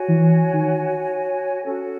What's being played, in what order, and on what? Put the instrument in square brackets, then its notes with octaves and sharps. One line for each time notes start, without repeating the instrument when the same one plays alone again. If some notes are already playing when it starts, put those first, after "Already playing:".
Already playing: [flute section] F#4 C#5 G#5
[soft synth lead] E3
D#3
[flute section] C#4 F#4 A4